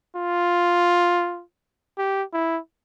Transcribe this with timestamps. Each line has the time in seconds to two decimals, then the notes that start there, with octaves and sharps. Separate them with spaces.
0.16 F4
1.98 G4
2.33 E4